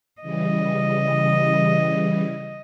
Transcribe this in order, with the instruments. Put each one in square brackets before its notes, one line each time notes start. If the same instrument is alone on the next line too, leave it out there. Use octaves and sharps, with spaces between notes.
[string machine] C#3 E3 G3 [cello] D#5